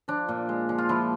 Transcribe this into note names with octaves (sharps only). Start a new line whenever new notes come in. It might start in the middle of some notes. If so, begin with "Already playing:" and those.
F3 D4
A#2
G#3
F3
F4
F3 E4